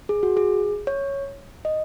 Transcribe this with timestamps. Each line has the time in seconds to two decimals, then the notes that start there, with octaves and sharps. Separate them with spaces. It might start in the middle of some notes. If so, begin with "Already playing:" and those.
0.09 G#4
0.23 F#4
0.37 G#4
0.87 C#5
1.65 D#5